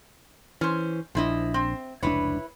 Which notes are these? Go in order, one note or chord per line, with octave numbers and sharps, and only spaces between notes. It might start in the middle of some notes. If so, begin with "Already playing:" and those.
E3 C#4 C5
A#1 C#3 F3 D4 E4 D#5
C4
F1 C#2 D4 E4 B4 C#5